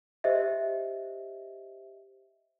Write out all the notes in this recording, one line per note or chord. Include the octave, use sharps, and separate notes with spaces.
G4 C5 D#5 E5